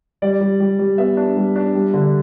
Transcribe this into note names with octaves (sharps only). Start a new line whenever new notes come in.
G3 D5
G3
G3
G3
B3 E5
D4
G3
D4
G3
D3